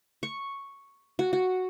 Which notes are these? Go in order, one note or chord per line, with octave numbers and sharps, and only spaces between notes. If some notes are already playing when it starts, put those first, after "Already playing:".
C#6
F#4
F#4